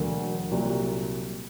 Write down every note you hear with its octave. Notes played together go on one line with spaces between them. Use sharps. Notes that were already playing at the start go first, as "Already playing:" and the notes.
Already playing: E1 D2 D3 F#3 A#3
C2 A#2 F#3